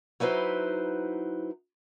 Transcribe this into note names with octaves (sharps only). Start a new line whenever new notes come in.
F#3 D#4 E4 B4 C5